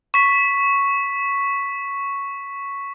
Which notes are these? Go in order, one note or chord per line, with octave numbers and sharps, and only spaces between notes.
C#6 B6